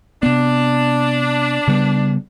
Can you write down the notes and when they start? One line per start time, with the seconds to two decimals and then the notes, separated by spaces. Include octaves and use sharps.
0.23 C3 B3 D4
1.68 C#3 G3 B3